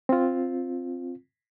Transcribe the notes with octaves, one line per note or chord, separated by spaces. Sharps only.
C4 F4